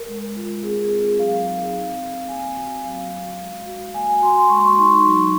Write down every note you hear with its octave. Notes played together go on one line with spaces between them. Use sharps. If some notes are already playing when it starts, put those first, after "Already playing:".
Already playing: A#4
G#3
F4
C4 G#4
G#4
C4
G#4
F#3 F5
D#4
C4
C4
A#3 G#5
F#4
F#3 F5
F#4
G#3
F#4
A#3 G#5
G#5
F#4 C6
C6
G#3 C#6
C6
C#6
D#4
F#3